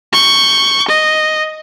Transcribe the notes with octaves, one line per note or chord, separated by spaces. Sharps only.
C#6 G6
D#5